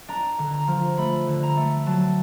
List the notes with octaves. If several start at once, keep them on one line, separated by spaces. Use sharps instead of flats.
D4 A#5
D3
A#5
F3
A3 B5
D3
A#5
A3
F#3 A5